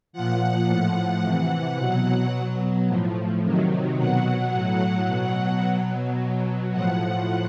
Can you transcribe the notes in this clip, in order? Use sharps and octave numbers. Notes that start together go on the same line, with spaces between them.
A#2 F3 F#5
A2 F3
C3 E3 F#5
B2 F#3
B2 F#3
A2 F3
C3 D#3 F#3
B2 F#3 F#5
A2 F#3
B2 F#3 F#5
B2 F#3
B2 F#3
A2 F3 F#5